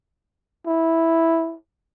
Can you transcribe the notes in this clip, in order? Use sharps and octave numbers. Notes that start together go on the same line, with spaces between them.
E4